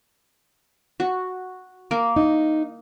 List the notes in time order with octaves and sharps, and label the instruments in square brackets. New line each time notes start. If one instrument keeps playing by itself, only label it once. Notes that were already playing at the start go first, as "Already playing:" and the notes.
[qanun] F#4
A#3 A#4
[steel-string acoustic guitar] D#4